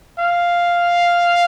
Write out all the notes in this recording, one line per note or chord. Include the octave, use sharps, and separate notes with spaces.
F5